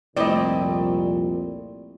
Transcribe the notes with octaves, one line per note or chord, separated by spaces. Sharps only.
C2 F2 A#2 A3 C4 E4 D5 D#5